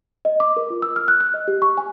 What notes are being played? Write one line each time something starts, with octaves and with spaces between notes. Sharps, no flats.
D#5
D6
A#4
F4
E6
F6
F#6
F#6
D#5
G4
C#6
G#5